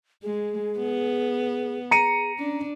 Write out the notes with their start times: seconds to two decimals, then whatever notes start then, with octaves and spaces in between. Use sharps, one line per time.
0.23 G#3 G#4
0.79 B3
1.91 G#4 A#5 C#7 D#7
2.38 C#4 D4